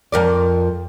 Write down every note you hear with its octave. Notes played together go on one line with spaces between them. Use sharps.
F2 A#4 D5